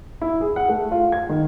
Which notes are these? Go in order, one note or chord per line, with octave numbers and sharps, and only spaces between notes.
E4
G#4
F#5
A3
F4
G#6
D#3